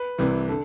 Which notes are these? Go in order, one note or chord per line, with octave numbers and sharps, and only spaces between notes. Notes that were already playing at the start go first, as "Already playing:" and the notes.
Already playing: B4
C2 C3 E3
D3 A4